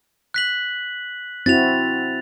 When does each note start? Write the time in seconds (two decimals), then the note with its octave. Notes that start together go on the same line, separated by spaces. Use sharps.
0.34 F#6 B6 F#7
1.46 C4 E4 F#4 A6 F7